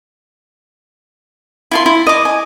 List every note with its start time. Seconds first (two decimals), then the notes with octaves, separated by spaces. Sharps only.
1.71 E4 F4 C6
1.86 E4
2.07 D#5 D6
2.25 G#5